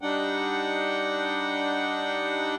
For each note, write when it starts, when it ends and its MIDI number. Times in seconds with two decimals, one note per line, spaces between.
0.01 2.55 55
0.01 2.55 62
0.01 2.55 63
0.01 2.55 78
0.01 2.55 79